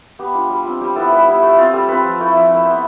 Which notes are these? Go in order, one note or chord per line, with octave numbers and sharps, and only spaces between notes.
B3 G4
D4 F4
G3
C4 F4
G3 G4
B3 E4 A4
G3 B4
B3 E4
A3
C4 F4
G3 A4
C4 F4 B4
F3
A3 E4
F3
A3 E4
B3 C5